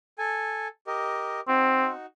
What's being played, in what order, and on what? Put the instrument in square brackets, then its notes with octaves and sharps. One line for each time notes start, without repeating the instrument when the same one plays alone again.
[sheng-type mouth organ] A4 G#5
G4 A#4 D#5
[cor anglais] C4 [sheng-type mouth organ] D#4 F#4